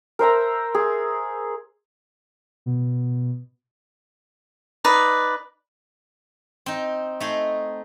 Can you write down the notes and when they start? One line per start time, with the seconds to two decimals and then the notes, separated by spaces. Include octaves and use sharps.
0.19 A#4 C5 E5 A#5
0.75 G#4
2.66 B2
4.85 D#4 B4 D5
6.66 C4 D#4
7.20 A3 D#4 G#4